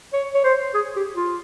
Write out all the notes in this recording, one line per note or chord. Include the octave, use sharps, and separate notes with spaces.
C#5
C#5
C5
G#4
G4
F4